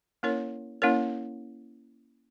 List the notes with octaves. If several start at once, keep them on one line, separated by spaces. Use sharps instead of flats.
A#3 C#4 E4 A#4 C#5
A#3 C#4 E4 A#4 C#5